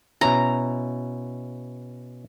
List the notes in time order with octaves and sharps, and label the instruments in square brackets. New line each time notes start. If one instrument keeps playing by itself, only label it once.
[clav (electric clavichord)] B2 C#4 E4 [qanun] A#5